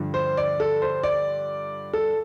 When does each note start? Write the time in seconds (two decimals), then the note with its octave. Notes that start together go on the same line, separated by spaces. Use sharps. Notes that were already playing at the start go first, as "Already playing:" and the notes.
Already playing: G2 D3 F3 D4
0.14 C5
0.37 D5
0.60 A4
0.82 C5
1.03 D5
1.93 A4